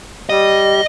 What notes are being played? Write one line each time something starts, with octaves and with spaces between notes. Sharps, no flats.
G3 D#5